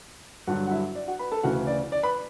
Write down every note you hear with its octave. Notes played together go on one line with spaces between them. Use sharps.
G2 D3 F#3 F#4 F#5
F#5
E4 E5
D5
F#4 F#5
B4 B5
A4 A5
D2 C#3 E3 F#4 F#5
D5
D5
B4 B5